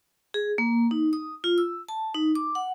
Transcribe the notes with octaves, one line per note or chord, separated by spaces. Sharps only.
G#4
A#3
D#4
D#6
F4
E6
A5
D#4
D6
F#5